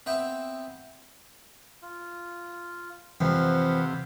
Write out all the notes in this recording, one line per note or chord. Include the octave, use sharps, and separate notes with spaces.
B3 C4 E5 G5
F4
F2 C3 E3 F5 F#5 B5